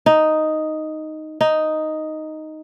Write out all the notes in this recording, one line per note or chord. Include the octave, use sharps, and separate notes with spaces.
D#4
D#4